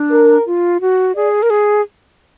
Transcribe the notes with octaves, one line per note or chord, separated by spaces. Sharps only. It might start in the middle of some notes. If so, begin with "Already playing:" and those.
Already playing: D4
A#4
F4
F#4
G#4 D5
A#4
G#4